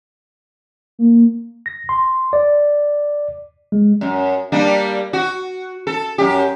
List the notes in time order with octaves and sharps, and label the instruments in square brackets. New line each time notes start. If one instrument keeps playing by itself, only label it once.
[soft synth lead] A#3
[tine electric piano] A#6
C6
D5
G#3
[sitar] F#2
G3 A#3 D4
F#4
A4
F#2 G4